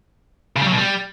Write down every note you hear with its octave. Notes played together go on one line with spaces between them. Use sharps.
C#3
G3
F#3
B2
G3